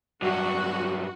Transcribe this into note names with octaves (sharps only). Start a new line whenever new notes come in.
G2 F#3 F#4